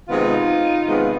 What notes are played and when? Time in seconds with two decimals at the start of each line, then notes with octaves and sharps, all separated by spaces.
0.08 C3 D#3 G#3 B3 D#4 F4
0.85 C3 D#3 G#3 B3